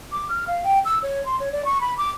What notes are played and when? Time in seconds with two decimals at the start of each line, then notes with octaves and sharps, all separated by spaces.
0.12 D6
0.29 F6
0.48 F5
0.64 G5
0.85 E6
1.03 C#5
1.26 C6
1.40 C#5
1.52 D5
1.65 C#6
1.81 B5
1.98 D6